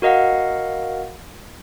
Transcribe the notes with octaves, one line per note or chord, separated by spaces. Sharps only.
F#4 A#4 D#5 F5 F#5